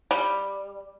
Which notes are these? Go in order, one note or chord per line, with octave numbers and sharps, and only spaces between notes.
G3